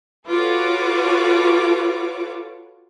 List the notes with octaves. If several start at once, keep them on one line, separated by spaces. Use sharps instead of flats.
F4 F#4 A4 B4 C#5 D6